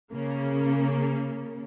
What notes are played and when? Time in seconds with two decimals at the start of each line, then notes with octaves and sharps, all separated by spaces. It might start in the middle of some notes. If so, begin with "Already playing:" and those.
0.12 C#3 A#3